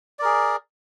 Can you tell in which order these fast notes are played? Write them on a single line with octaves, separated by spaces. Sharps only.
D5 A#4 G#4